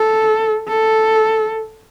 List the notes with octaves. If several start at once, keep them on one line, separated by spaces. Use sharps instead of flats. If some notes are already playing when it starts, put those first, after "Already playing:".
Already playing: A4
A4